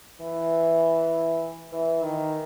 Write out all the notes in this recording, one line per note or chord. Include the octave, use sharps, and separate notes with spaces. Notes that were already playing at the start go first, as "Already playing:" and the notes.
E3
E3
D#3